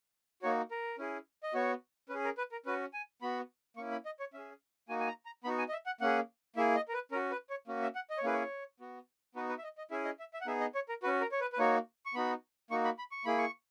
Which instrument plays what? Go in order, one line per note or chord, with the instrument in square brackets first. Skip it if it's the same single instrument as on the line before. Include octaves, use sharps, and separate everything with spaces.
[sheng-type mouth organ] A#3 D#4 F#4 C#5
A#4
C#4 E4 G#4
D#5
B3 F#4 C#5
C#4 B4
G#4
A#4
B4
A#4
C#4 F#4 B4
G#5
B3 F#4 B5
A#3 C#4 E4 C#6
B5
D#5
C#5
C#4 G#4 E5
A#3 D#4 F#4 G#5
G#5
A#5
A#5
B3 D#4 F#4 B5
G#5
D#5
E5
F#5
A#3 C#4 G#4 F#5
A#3 E4 G#4 E5
D#5
A#4
B4
C#4 A#4
F#4
B4
C#5
A#3 C#4 F#4
E5
F#5
D#5
C#5
A#3 C#4 E4 G#4 B4
C#5
B3 F#4
B3 D#4 F#4 B4
B4
E5
D#5
D#5
C#4 E4 G#4 E5
D#5
E5
E5
F#5
B3 D#4 G#4 E5
D#5
C#5
A#4
F#4 B4
C#4
A#4
C#5
B4
B4
A#3 D#4 F#4 C#5
C#6
B3 D#4 F#4 B5
A#3 D#4 F#4 C#6
B5
B5
C#6
A#3 E4 G#4 B5
C#6